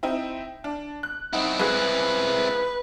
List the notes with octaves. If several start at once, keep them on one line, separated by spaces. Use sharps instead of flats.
C4 D#4 E4
D4
F#6
C4 D#4 E4 F#5
C#2 G#4 B4 F#6